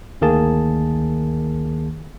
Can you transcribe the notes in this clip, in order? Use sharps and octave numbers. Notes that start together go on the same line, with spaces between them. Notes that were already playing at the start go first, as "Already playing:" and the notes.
D2 D#3 A#3 G#4 A5